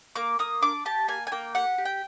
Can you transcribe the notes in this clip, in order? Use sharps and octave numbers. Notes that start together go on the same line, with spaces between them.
A#3 D6
A#3 D#6
D4 D6
G4 A5
A#3 G#5
G#5
A#3 G5
G4 F#5
G4
G5